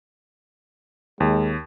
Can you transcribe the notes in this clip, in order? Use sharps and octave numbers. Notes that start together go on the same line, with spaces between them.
D#2 G#3